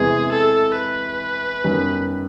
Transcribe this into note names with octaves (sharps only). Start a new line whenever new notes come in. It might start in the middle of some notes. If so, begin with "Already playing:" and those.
Already playing: E2 C3 E3 G#3 G#4
A4
B4
F#2 D#3 G3 B3